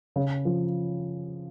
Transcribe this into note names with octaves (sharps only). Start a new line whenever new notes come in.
C#3
F3